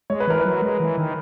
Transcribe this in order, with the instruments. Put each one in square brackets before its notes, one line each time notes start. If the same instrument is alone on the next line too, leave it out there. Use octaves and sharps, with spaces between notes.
[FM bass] G#3 [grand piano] C#5
[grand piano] B4
[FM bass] E3 [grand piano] A#4
[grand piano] B4
[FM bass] F#3
G#3
E3
D#3